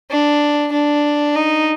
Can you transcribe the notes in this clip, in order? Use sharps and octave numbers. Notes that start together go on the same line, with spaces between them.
D4
D4
D#4